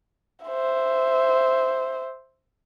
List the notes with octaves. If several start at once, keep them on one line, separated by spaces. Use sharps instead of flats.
C5 E5